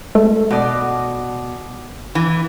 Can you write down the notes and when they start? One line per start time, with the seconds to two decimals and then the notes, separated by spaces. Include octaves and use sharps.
0.15 G#3 A3 A4
0.51 B2 D5
2.15 E3